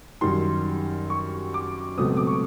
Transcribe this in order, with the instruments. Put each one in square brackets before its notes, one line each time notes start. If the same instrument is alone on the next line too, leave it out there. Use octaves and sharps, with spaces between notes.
[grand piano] F#2 D#3 G3 C6
C#6
D6
C#2 B2 F#3 A3 C4 D#6
D6
C#6